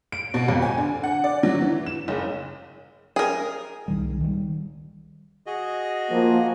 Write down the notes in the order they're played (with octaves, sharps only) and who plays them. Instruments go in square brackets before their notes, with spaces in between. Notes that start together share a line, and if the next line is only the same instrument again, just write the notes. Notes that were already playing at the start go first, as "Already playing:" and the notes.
[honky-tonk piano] D7
B2
F2
G#5
D3
F#5
D5
F#3
E3
E7
F#1
[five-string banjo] G#4 A#4
[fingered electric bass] C2 D#3 G3
D#3 G3
[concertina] F#4 G#4 D#5
[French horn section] F3 A#3